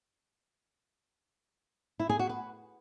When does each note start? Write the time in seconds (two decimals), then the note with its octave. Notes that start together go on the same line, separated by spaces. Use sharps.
2.00 E4
2.09 G#4
2.19 F#4
2.29 B4